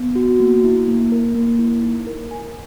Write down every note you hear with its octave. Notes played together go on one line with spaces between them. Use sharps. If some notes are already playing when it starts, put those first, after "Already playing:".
Already playing: B3
F#4
A#3
E4
A#3
A#4
A#3
E4
D#4
A#4
G#5